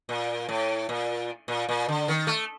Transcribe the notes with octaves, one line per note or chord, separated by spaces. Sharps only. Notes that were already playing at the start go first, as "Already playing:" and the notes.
A#2
A2
A#2
A#2
A#2
D3
D#3
A3